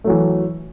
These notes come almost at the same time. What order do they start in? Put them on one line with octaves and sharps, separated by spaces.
A3 F#3 E3